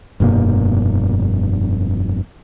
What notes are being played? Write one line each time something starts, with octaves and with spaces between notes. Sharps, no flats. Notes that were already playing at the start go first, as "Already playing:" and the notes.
F1 G2 B2 A#3